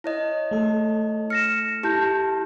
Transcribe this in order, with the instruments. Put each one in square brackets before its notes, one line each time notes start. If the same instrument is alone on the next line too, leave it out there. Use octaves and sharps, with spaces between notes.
[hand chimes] E4 C#5 D#5
[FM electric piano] A3 A4
[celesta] F6 A#6 E7 [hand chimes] C#7
[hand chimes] E4 G4 [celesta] A5 G6